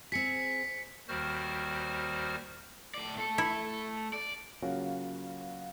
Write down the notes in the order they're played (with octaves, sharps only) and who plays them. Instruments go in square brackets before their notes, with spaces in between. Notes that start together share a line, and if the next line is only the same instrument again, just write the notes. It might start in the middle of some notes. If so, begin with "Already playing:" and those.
[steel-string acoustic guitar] C4 G#4 [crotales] B6 C#7
[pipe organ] D#2 D#3 G3 F#4 C5 F6
[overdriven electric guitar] A2 D5
A3 A4
[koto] E4
[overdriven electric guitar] D5
[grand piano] C#3 F#3 A#3 C#4 F4 F#4